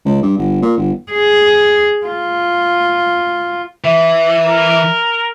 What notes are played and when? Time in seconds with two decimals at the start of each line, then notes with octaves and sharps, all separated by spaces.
0.05 C#2
0.23 G2
0.37 G1
0.62 A#2
0.77 G1
1.12 G#4
2.06 F4
3.84 E3 E5
4.45 A#4